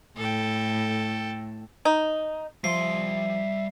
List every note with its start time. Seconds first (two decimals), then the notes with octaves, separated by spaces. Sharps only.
0.17 A2 A4 G5
1.85 D#4
2.64 F3 G3 E5 C6 C7